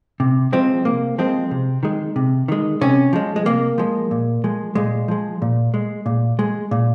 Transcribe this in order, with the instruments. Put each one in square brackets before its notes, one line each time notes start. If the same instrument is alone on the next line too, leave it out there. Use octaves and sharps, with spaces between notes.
[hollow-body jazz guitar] C3
F3 G#3 C4
C3 A#3
F3 G#3 C4
C3
D#3 G#3
C3
D#3 G#3
C3 C#4
F3 G#3
G#3
C3 A#3
F3 G#3
A#2
F3 G#3
A#2 G#3
F3 G#3
A#2
G#3
A#2
G#3
A#2